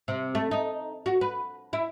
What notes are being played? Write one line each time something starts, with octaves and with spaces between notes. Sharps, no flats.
C3
A3
D#4
F#4
B4
E4